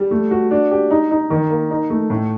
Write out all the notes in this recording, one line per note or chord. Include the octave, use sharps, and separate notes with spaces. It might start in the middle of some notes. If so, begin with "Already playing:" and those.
Already playing: G3
A3
F#4
D4
G4
D#4
D#4
D#3
A#3
D#4
A3
A2